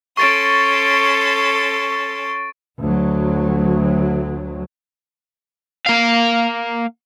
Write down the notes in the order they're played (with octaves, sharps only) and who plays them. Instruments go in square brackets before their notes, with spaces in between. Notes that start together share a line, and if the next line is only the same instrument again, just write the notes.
[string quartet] C#4 A4 C6 [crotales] C#6 A6 D7
[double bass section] D2 F#3
[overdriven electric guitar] A#3 F5